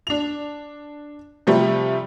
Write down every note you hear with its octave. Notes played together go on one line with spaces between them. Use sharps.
D4 F7
C3 F3 G3 A3